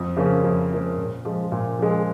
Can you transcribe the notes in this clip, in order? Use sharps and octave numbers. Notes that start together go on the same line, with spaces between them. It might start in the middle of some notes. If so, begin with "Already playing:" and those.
Already playing: F2
C#3 F3 A#3 C#4
F2
C#3 F3 A#3 C#4
A#2
F3 G#3
A#2
F3 G#3